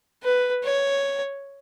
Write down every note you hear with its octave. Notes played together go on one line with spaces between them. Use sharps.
B4
C#5